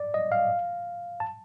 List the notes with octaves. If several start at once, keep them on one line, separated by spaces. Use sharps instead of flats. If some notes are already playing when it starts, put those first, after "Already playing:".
Already playing: D5
D#5
F5
A5